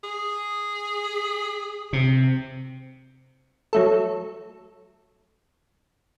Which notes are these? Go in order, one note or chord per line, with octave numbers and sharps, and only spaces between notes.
G#4
C3
F#3 A3 A4